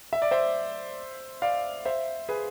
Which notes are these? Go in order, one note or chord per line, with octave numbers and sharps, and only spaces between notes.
E5
D5
C5 E5
D5 F5
C5 E5
G#4 B4